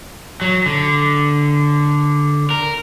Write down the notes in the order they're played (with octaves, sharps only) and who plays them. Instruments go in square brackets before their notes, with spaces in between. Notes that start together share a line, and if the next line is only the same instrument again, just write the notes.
[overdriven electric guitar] F#3
D3
A#4